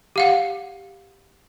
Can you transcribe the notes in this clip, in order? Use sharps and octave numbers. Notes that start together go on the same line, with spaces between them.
G4 F5 F#5